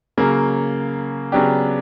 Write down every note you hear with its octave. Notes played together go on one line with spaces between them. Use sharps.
C#3 F#3 A#3
C#3 F#3 B3 D4 G4